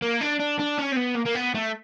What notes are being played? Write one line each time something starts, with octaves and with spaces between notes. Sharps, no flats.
A#3
D4
D4
D4
C#4
C4
B3
A#3
A#3
B3
A3